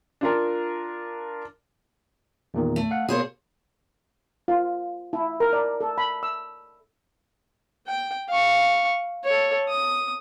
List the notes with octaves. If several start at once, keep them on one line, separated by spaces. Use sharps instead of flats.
D4 F4 A#4
E2 A#2 D#3
A3
F5 F#5
B2 A#3 G#4 C5 C#5
F4
E4
A#4
D5
A4
B5
E6
G5
F5 C#6
A4 C#5
D#6